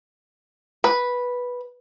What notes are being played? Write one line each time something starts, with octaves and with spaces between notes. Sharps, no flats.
B4